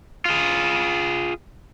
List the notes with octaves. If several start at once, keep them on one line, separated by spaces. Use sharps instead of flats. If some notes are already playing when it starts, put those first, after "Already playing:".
F4 G#4